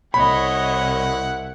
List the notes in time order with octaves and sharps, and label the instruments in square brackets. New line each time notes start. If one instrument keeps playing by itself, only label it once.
[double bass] C2 [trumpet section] E4 F#5 [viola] C#5 D#5 [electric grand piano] B5